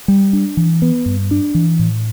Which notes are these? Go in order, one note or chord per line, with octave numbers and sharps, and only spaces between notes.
G3
D4
E3
B3
G2
D4
E3
A2